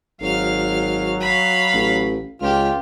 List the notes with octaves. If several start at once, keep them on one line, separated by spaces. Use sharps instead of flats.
G#1 F#3 F5 F6
F5 B5
A1
C#2 F4 G4 F6